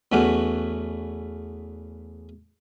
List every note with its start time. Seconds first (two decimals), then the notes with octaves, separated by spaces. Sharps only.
0.12 E2 A3 B3 C#4 F#4 D6